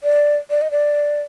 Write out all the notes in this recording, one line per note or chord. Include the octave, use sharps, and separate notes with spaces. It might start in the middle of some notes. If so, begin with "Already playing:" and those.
D5
D5
D#5
D5